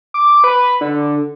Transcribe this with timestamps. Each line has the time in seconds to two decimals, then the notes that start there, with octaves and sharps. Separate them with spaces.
0.14 D6
0.44 B4
0.81 D3